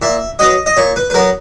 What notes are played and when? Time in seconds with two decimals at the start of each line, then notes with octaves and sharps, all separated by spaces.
0.02 A#2 E5
0.39 F#3 B3 D#5
0.66 D#5
0.76 A#2 C#5
0.96 B4
1.10 B4
1.14 F#3 B3 A#4